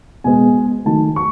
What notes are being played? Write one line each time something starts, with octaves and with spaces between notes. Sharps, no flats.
B2 G#3 B3 G#5
D#3 F#3 A3 A5
C#6